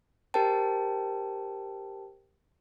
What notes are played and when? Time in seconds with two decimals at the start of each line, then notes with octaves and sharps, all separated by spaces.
0.34 G4 A#4 C5 G5 A5